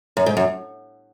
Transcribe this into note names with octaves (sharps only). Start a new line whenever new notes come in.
F#2
G#2
F#2